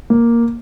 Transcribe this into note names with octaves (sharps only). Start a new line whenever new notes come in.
A#3